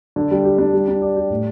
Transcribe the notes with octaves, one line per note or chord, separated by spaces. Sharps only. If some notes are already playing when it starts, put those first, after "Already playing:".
D3
G3
G4
D4
G3
D4
D5
G4
A2